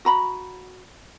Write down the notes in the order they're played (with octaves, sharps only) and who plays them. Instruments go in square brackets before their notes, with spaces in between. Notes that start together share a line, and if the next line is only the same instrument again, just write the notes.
[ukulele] F#4 A#5 B5